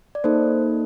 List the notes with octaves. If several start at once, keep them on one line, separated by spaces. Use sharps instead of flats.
D5
A#3 D#4 A4 C5